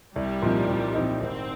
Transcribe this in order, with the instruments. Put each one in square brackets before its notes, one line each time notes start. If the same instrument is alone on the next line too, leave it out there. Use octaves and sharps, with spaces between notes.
[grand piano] C2 [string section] G3
[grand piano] A#2 F3 C4 D#4
C2
A#2 F3 C4 D#4
[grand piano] G#1 [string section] C4